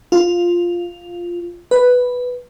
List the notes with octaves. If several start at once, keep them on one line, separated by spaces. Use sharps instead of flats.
F4
B4